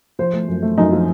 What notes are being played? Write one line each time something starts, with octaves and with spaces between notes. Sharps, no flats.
F3 C5
A3
F#2
A3
F#2 D#4
F3